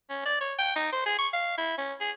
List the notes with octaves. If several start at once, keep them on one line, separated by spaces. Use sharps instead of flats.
C#4
D5
C#5
G5
D#4
C5
G#4
C#6
F5
E4
C#4
G#4